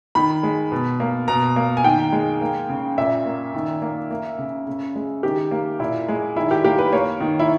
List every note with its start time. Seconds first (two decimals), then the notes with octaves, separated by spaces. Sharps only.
0.15 D#3 B5
0.43 G#3
0.72 B2
1.00 A#3
1.28 B2 A#5
1.56 A#3
1.77 G#5
1.84 D#3 G5
2.12 G#3
2.41 A#3
2.69 C#3
2.97 A#2 E5
3.26 A#3
3.54 D#3
3.82 A#3
4.11 A#3
4.39 C#3
4.67 C#3
4.95 G#3
5.23 D#3 G4
5.51 A#3
5.79 A#2 E4
6.08 G#3
6.36 D#3 E4
6.51 G4
6.64 A#3 G4
6.79 B4
6.92 A#3 C#5
7.21 D#3
7.39 E4